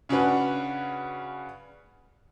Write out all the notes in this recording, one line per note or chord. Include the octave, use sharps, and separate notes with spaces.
C#3 C#4 D4 F#4 B4